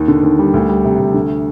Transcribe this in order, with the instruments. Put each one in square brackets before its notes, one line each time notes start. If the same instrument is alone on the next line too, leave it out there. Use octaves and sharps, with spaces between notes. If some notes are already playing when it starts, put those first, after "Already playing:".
Already playing: [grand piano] D#2
D3
D#2
G3
D2
G3
C3
D2
D3